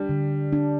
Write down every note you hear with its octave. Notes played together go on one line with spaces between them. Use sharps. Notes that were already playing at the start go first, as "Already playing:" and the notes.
Already playing: G3 D4
D3
D4